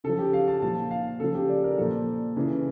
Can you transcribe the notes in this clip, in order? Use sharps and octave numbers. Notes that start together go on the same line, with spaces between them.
C#3 F3 A4
G4
F5
A5
A#2 F3 A5
F5
C#3 F3 A4
G4
D5
A#4
A#2 F3 A4
C#3 E3